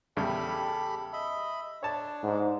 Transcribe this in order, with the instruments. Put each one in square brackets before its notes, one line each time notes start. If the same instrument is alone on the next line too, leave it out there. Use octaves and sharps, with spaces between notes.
[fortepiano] E2 C#3 G3 [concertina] G4 A4 B5
[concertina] D#5 E5 B5
[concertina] D4 [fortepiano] C#5 A5
[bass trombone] G#2